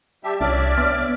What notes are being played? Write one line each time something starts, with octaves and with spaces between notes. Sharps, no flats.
G3 G4 E5 A5
C2 D4 C#5 D5 E5 D6 F6
B3